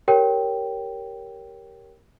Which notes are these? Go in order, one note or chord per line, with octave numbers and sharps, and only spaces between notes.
G4 A#4 C#5 G5